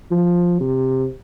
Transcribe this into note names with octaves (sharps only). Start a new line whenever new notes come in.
F3
C3